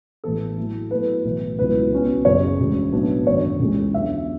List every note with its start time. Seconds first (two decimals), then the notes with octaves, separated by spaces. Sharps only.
0.24 A1 A2 E3 B3 A4
0.57 A2 F#3 A3 E4
0.91 A2 F#3 B3 E4 B4
1.25 B1 A2 E3
1.58 C#2 B2 F#3 B3 E4 B4
1.92 B1 B2 F#3 C#4
2.25 F#1 F#2 C#3 C#5
2.59 E1 D2 C#3
2.92 B1 A2 F#3 B3 D4
3.27 G#1 F#2 D3 C#5
3.59 C#2 C#3 E3 G#3
3.93 E2 D3 F#3 C#4 E5